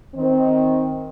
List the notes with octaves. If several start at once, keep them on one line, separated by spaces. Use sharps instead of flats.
D#3 C4